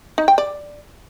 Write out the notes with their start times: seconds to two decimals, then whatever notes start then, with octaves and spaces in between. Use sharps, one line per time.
0.18 D#4
0.28 G5
0.38 D5